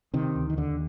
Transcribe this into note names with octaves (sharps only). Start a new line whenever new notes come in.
C3 D#3
D2
D#3
D#2 D3